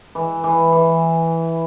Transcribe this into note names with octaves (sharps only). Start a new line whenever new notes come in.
E3
E3
E3